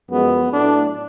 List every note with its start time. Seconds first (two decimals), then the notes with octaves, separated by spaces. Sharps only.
0.09 F#2 F3 G#3 B3
0.50 A2 F#3 A3 D4